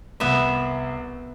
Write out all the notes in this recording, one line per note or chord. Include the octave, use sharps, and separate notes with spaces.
C2 B3 E5